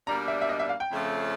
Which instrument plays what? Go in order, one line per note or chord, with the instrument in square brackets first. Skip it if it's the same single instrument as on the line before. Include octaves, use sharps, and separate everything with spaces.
[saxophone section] B2 G3 A#3 D4 [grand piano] A#5
[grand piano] E5
E5
D#5
E5
F5
G5
[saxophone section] F2 C#3 F3 A3 C#4